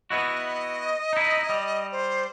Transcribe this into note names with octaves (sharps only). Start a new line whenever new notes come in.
B3 E4 F#4 D#5
D#4 E4
G3
C5